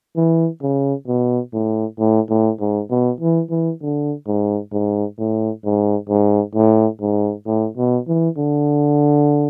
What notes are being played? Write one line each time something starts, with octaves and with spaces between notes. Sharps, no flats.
E3
C#3
B2
A2
A2
A2
G#2
B2
E3
E3
D3
G#2
G#2
A2
G#2
G#2
A2
G#2
A2
B2
E3
D3